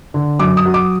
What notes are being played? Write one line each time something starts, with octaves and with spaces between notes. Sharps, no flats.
D3
F#2 D6
D#6
F#3
D6